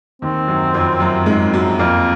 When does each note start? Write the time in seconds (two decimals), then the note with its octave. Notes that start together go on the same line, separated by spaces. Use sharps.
0.22 D#2 D#3 C4
0.48 F#2 F#3
0.74 F2 F3
1.00 F#2 F#3
1.26 G#2 G#3
1.53 F#2 F#3
1.79 F2 F3 A#3